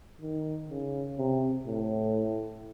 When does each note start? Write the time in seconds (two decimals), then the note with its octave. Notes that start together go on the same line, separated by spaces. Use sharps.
0.22 D#3
0.70 C#3
1.18 C3
1.67 A2